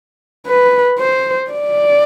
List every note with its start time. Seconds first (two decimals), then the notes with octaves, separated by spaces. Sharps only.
0.47 B4
0.99 C5
1.51 D5